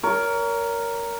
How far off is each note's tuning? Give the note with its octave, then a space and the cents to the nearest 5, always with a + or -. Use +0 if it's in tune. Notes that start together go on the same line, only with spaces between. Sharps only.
A#4 +0 C#5 +35